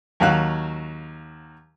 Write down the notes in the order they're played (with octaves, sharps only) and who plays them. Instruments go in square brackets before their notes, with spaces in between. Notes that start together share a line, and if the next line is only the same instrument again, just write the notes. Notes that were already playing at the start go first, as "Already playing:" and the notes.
[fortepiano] D#2 F#3 F5 F#6